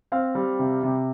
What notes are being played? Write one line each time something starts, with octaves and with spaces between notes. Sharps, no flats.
C4 F5
G3
C3
C3